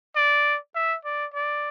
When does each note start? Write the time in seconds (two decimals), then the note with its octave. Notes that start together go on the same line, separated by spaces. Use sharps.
0.16 D5
0.76 E5
1.05 D5
1.34 D5